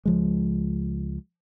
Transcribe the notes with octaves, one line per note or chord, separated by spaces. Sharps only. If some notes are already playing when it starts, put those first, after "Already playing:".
C#2 F3 G#3